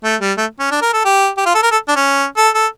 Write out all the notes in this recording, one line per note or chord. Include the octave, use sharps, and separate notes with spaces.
A3
G3
A3
C#4
D4
A#4
A4
G4
G4
F4
A4
A#4
A4
D4
C#4
A4
A4